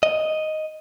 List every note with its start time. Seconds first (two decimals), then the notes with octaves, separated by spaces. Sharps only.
0.03 D#5